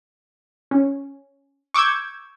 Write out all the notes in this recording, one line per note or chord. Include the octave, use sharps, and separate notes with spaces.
C#4
C#6 D6 E6 G6 G#6